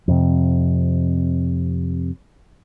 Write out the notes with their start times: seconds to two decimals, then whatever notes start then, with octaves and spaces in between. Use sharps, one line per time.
0.08 F2 C3